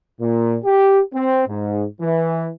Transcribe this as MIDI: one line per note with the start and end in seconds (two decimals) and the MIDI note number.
0.21 0.56 46
0.65 1.00 67
1.14 1.42 60
1.48 1.85 44
2.01 2.49 52